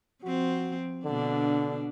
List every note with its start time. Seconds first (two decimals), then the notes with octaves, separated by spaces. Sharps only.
0.24 F3 C4 F#4
1.05 B2 D3 D4